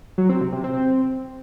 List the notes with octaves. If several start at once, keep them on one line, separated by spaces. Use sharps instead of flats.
F#3
C4
C3
C3
C4